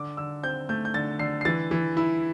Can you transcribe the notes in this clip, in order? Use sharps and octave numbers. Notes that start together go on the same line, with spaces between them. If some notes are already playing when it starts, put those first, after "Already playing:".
Already playing: D3 D6
D3 E6
C4 G6
A3 G6
G6
D3 A6
D3 C7
C7
E3 A6
E3
E4